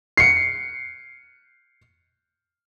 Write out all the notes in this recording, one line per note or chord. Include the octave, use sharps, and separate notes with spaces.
C7 C#7